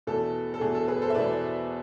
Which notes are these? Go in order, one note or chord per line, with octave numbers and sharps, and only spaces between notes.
E2 B2 A3 A4
A4
E2 B2 A3 G#4
A4
G#4 B4
A4 C5
E5
E2 B2 A3 B4 D5